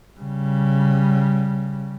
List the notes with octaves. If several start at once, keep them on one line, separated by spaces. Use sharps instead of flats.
C#3 G3